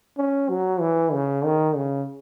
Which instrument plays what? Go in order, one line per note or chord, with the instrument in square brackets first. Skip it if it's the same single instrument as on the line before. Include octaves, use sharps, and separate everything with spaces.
[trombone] C#4
F#3
E3
C#3
D#3
C#3